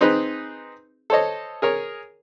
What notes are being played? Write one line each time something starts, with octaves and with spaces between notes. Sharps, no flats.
C4 D#4 G#4 B4
A4 C5 C#5 D#5
G#4 A#4 C#5